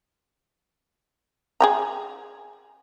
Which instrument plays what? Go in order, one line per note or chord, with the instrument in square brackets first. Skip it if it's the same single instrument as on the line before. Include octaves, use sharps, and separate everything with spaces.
[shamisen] G#4 G5 A#5